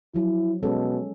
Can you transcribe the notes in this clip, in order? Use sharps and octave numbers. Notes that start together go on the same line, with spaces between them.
F3 F#3 E4
B2 G#3 C#4 A4